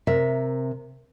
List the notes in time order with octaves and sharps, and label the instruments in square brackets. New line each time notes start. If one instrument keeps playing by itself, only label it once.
[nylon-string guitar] C3 A#4 E5